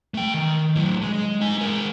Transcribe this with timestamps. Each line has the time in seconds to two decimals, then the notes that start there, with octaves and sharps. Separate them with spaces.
0.14 A3 G5
0.34 D#3
0.76 A2 F#3
1.02 G#3
1.41 D#4 G#5
1.58 G#3 A#4